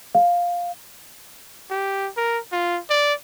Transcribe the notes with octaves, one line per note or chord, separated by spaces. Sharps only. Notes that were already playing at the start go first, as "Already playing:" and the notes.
F5
G4
A#4
F4
D5